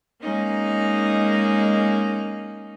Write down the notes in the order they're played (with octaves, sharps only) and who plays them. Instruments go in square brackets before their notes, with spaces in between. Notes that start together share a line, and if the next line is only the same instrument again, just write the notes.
[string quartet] G#3 A#3 C#4 D#4